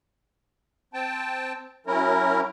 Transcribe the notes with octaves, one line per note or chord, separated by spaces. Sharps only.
C4 G5 A5
F#3 C#4 E4 A#4